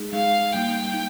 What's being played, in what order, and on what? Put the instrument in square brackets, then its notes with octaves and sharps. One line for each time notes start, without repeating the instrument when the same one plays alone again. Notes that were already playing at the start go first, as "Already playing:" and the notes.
Already playing: [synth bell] G#3 D#4 G#4
[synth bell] G#3 D#4 G#4 [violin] F5
[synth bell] G3 A#3 D#4 [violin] G5
[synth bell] D#4